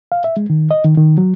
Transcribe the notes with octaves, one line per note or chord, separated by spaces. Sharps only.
F5
E5
G#3
D#3
D#5
D#3
D#3
F#3